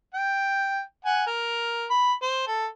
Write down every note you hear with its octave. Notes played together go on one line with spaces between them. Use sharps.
G5
F#5 G#5
A#4
B5
C5
A4